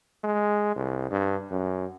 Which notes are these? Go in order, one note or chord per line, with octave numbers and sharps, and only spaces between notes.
G#3
C2
G2
F#2